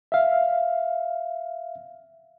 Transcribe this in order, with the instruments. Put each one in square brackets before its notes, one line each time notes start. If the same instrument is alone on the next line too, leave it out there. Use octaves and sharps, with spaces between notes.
[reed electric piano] E5 F5